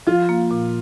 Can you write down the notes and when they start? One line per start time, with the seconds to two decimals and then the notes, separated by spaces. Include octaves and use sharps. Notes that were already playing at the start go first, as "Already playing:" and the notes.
0.07 F3 F4
0.29 A#3
0.51 A#2